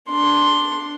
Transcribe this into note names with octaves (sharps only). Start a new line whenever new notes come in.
D4 C6